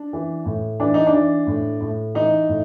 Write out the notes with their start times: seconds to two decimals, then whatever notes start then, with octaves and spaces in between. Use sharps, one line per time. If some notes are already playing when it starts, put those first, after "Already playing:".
Already playing: D4
0.13 E3
0.46 A2
0.80 E3 D4
0.94 D#4
1.07 D4
1.13 E3
1.47 A2
1.81 A2
2.15 E3 D#4
2.49 A2